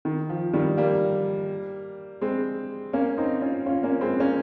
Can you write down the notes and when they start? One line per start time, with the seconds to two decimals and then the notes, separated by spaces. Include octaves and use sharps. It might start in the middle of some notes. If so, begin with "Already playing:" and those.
0.05 D#3
0.29 F3
0.53 D#3 G3
0.77 G3 A#3
2.21 G#3 C4
2.93 A#3 C#4
3.18 C4 D#4
3.41 C#4 F4
3.66 C#4 F4
3.83 A#3 C#4
4.01 G#3 C4
4.20 A#3 C#4